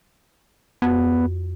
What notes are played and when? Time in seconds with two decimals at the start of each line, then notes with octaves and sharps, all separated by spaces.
0.82 F2 B3 F#4